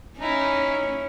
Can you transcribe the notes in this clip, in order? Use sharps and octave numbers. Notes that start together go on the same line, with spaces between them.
C#4 D#4 E4